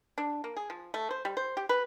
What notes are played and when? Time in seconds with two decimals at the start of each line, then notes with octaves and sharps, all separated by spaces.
0.18 D4
0.44 A#3
0.57 G#4
0.70 F3
0.94 A3
1.11 C5
1.25 G3
1.37 C5
1.57 G4
1.69 B4